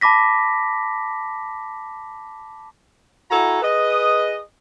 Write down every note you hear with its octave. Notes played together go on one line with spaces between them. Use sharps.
A5 B5 D6 A#6 B6
E4 F#4 A4 G#5 A#5
G#4 B4 D#5